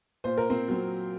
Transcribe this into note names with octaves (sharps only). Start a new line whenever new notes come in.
A#2 C5
A#4
C4 C5
F#3 C4